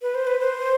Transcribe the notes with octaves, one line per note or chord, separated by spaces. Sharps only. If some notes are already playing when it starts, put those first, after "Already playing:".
B4
C5
B4
C5